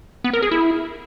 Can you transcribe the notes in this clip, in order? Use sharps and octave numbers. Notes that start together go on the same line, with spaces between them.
B3
A#4
G#4
E4